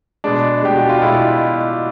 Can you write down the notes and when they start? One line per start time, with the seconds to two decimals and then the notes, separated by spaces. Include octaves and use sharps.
0.24 B2 G#3 D4
0.62 B2 G#3 G4
0.77 F#4
0.89 F4
1.02 B2 G#3 E4